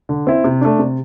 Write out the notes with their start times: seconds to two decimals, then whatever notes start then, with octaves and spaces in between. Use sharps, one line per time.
0.09 D3
0.27 C4 E4
0.44 C3
0.61 A3 D4
0.79 C3